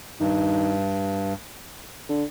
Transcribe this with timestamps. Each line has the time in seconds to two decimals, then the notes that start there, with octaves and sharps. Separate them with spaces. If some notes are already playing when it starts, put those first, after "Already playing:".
0.20 G2 D#3
2.09 D3